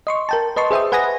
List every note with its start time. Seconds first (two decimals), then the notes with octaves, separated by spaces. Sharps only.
0.07 D#5 C6 C#6
0.29 A#4 G5 A5
0.57 B4 D#5 A5 C6 C#6
0.71 G#4 C5 E5 G5 D#6
0.92 B4 F#5 G#5 B5 D#6 A#6